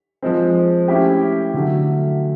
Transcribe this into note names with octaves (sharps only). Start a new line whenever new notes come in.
F3 G#3 C4
A3 C#4 E4 G4
D3 F#3 A3